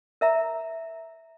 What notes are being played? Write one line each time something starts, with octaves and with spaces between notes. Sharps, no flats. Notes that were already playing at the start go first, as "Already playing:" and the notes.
A#4 E5 A#5